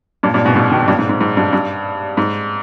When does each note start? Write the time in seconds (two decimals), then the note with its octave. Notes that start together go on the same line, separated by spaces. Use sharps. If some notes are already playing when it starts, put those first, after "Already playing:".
0.23 G2 A#2
0.34 G2 A#2
0.45 G#2 B2
0.55 G#2 B2
0.71 B2 D#3
0.88 G2 A#2
0.99 G#2
1.09 G#2
1.21 G#2
1.37 G2
1.53 G2
2.17 G#2